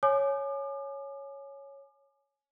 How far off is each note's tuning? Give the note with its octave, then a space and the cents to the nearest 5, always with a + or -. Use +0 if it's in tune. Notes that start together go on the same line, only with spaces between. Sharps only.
C#5 +0 G#5 +25 D6 +40